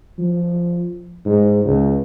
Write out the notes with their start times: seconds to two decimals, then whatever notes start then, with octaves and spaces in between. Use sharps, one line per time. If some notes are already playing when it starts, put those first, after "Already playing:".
0.19 F3
1.25 G#2
1.65 C#2